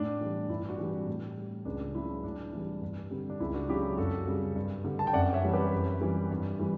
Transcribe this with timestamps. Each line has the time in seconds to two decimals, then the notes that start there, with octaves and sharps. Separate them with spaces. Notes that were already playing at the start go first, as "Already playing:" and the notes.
Already playing: A2 D4
0.21 E3 G3
0.49 G2 E4
0.69 D4 F#4
0.78 E3 G3
1.07 A2
1.37 G3
1.65 C#2 D4
1.95 C#3 F#3 E4
2.24 A2 D4
2.53 E3 G3
2.82 G2
3.11 D3 G3
3.30 D4
3.40 C#2 E4
3.54 D4 F#4
3.69 C#3 F#3 E4 G4
3.98 F#2 F#4 A4
4.27 C#3 G3
4.55 G2
4.84 D3 G3
4.99 A5
5.07 G5
5.13 F#2 D5 F#5
5.33 C#5 E5
5.43 E3 G3
5.53 G4 B4
5.72 F#2
6.01 E3 G3
6.31 G2
6.59 E3 G3